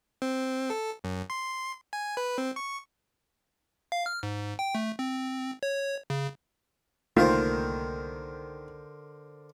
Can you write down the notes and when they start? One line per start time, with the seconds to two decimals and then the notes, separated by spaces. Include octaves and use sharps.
0.22 C4
0.70 A4
1.04 F#2
1.30 C6
1.93 G#5
2.17 B4
2.38 C4
2.56 C#6
3.92 F5
4.06 F6
4.23 G#2
4.59 G5
4.75 A3
4.99 C4
5.63 C#5
6.10 C#3
7.17 C2 D3 D#3 A3 A#3 F4 A#4 C5